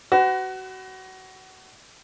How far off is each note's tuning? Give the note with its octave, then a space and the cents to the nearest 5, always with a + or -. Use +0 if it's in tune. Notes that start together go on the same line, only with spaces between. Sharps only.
F#4 +25 B4 +40